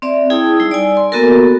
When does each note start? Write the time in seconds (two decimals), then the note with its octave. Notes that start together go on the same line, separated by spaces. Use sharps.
0.02 C4 D5 E5
0.30 E4 G#4 G5 A5 D#6 E6
0.60 G3 D#4 E6
0.71 D5 G#5
0.97 C6
1.12 A#3 B3 F#4 A4 A#4